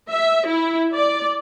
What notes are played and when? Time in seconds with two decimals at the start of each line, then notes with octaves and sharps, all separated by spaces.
0.10 E5
0.47 E4
0.95 D5